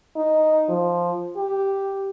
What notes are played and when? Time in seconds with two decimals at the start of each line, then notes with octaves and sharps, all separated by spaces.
0.16 D#4
0.69 F3
1.37 G4